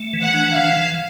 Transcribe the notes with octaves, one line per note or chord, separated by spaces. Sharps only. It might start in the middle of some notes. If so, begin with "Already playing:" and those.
Already playing: A3
E3
F#5
D4
E3 F5
E3